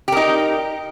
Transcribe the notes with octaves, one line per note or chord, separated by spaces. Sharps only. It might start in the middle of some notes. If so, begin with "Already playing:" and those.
D#4 G4 A#4